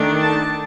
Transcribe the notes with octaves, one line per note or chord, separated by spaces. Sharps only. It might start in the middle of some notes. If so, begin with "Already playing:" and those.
Already playing: D#3 A3 D4
A5